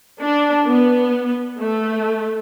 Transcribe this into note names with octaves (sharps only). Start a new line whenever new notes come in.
D4
B3
A3